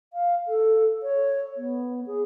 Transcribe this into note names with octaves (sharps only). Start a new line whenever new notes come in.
F5
A4
C#5
B3
G#4